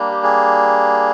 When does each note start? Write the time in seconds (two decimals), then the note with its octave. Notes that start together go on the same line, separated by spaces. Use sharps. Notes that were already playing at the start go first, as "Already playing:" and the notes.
Already playing: G3 A#3 D4
0.12 G4
0.23 G#4